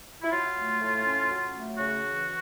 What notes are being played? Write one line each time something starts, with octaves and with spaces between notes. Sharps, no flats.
E4
F#3 F4
A3
A2
C#4
F#3
A3
C#3 F#4
E3